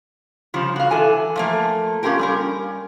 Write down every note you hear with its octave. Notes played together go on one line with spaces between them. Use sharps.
C#3 F3 G3
F#4 F5
E3 A4 G#5
F3 A3 A#3
A#3 C#4 F4 G4 A#4
G3 C#4 A#4